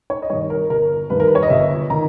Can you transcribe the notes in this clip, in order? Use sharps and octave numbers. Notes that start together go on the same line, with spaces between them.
C#5
D#5
G2 D#3 C#5
A#4
G1 A#4
G2 D#3 B4
A#4
B4
C#5
D#5
G1 E5
D#3 A#5